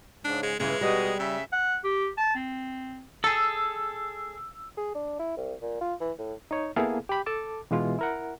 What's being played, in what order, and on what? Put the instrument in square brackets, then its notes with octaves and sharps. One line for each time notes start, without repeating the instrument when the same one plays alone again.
[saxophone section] G#2 C#3 [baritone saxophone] D4
[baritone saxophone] G#3
[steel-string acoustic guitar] G2 C#3 [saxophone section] E3 F4 [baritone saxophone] G#3
[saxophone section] B2 D#5 [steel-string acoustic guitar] G3
[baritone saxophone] C#3 [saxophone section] E5
[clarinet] F#5
G4
A5
C4
[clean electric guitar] G#4 A4 [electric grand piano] E6
[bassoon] G#4
D4
E4
C2
A#2
F4
E3
A2
[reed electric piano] D#4 C#5
A#3 B3 E4 G#4 A4 F5
G4 B5
A4 A5 D6
B2 E3 G#3 F4
E4 A#4 F#5